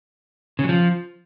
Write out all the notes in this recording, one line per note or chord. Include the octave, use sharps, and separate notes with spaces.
C#3
F#3
F3